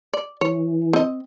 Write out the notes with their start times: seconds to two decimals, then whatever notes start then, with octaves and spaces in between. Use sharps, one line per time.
0.13 D5
0.41 E3 C#5
0.93 C4 D#5